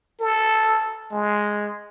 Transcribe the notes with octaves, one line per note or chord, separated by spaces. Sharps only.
A4
G#3